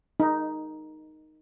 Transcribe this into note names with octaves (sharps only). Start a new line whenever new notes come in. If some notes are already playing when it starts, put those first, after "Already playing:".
D#4